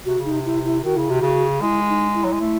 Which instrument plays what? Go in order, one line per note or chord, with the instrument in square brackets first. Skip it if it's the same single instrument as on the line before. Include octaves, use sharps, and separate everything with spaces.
[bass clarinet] C3 [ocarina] F#4
[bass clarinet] C#3
[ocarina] D#4
[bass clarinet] C3
[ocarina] E4
E4
[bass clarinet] D#3 [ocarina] F#4
[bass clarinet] C#3 [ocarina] E4
[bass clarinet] C3 [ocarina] F#4
[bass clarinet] C#3
[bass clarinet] G#3 [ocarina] E4
[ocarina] D#4
E4
[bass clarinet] F#3
G#3
A3